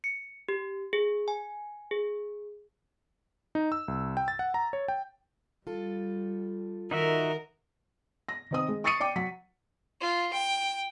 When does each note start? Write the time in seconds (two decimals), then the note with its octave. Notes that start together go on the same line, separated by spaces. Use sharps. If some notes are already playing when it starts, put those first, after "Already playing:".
0.04 C#7
0.49 G4
0.93 G#4
1.28 G#5
1.91 G#4
3.55 D#4
3.72 E6
3.88 C2
4.17 G5
4.28 A6
4.39 F#5
4.54 A#5
4.73 C#5
4.88 G5
5.67 G3 F4 A4
6.91 D#3 D#4 F#4 A#4 E5
8.29 A#6
8.51 D#3 C4 D#6
8.68 G#3
8.84 C#6 D#6 A6 C7 C#7 D#7
9.00 D5 G5 D6
9.16 F#3 B6
10.01 F4
10.33 G5